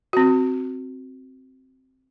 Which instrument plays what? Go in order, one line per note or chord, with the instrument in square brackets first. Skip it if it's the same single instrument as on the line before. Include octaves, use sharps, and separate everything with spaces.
[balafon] C4 F#4